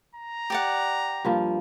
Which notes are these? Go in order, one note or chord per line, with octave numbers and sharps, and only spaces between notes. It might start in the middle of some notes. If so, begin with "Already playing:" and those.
A#5
G4 D5 F#5
G2 F3 A#3